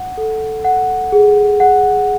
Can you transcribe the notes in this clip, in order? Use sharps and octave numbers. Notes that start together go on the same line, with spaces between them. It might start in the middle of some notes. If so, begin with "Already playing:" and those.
Already playing: F#5
A4
F#5
G#4
F#5